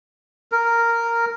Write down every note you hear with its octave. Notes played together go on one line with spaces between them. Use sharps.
A#4